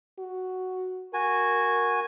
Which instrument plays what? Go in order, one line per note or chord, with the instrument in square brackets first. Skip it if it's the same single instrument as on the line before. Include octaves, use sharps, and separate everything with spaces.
[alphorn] F#4
[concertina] F#4 G#5 [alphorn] A#4